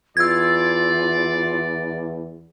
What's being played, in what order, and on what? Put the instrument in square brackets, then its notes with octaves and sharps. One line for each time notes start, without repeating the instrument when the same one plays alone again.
[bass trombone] E2 [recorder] F4 [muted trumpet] D5 [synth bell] E6 G#6